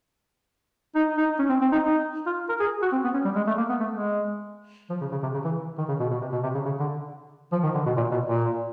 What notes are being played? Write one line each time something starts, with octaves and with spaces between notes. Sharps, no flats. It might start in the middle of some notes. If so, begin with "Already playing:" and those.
D#4
D#4
C#4
C4
C4
D#4
D#4
F4
A#4
G#4
F#4
C4
B3
C#4
G3
G#3
A3
A#3
B3
A3
G#3
F3
C#3
C#3
C3
C#3
E3
D#3
C#3
B2
B2
C3
B2
C3
C#3
C#3
D3
F3
D#3
D3
B2
A#2
B2
A#2